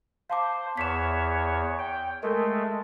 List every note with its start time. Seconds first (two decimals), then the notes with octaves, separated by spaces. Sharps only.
0.30 C5 F5 A5 D6
0.77 E2 C#5 B6 E7
1.79 G5
2.23 G#3 A3 A4 A#4